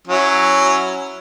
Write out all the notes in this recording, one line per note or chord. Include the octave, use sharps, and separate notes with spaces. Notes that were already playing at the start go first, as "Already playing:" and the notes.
F#3 C#4 E4